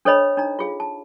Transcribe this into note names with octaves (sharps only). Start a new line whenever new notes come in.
D4 A4 C5 C#5 D#5 B5
D4 D#4 A#5
F4 G#4 F5
A5